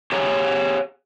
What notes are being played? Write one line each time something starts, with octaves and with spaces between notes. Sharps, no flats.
G4 G#4 C#5 A#5